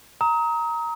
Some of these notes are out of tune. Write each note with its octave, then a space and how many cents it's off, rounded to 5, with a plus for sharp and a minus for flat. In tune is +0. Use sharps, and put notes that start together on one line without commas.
A#5 +0 D#6 +35